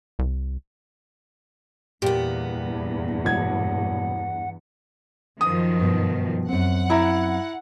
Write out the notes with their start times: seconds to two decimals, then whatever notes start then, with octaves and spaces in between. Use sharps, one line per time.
0.19 C2
2.02 E2 G2 A#2 B3 G4
3.25 E1 F#5 G#6
5.41 F#2 D#3 F3 D#6
5.79 G2 B2
6.48 F#2 C4 F#5
6.90 E4 A#5